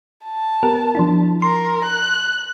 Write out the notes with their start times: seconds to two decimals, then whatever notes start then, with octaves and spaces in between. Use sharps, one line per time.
0.25 A5
0.63 B3 G4 A#4
0.95 F3 D4 E4
1.42 A#4 C6
1.85 F#6